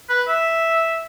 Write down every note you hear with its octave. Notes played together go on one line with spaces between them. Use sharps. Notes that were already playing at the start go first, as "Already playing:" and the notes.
B4
E5